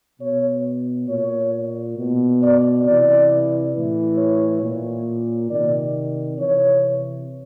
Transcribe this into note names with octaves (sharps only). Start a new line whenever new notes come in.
B2 C#5
A#2 C#5
B2
D5
C3 E3 D5
A2 E3
C#5
A#2
C3 D#3 D5
C3 E3 C#5